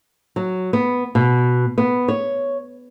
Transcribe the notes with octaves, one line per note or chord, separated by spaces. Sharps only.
F#3
B3
B2
B3
C#5